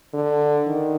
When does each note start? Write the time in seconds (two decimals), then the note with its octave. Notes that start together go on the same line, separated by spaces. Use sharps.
0.14 D3
0.67 D#3